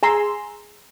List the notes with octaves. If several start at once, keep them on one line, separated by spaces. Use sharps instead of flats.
G#4 G#5 A#5 C6 E6